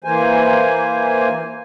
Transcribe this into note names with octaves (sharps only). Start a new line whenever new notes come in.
E3 A#3 C5 G#5